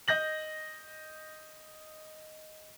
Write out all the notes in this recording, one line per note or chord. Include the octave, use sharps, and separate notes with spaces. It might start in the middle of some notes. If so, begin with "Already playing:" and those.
D#5 G6 A#6 F#7